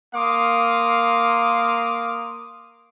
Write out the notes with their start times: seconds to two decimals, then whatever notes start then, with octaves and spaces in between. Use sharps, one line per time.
0.15 A#3 F5 C6 D6 D#6